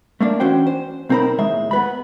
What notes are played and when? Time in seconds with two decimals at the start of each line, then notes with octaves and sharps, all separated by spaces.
0.20 A3 A#3 D4
0.40 E3 C#4 F#4 C5 G5
0.67 C5
1.09 B1 C4 D#4 A#4 C5 B5
1.38 D#2 A2 G#3 E5
1.71 B3 B4 B5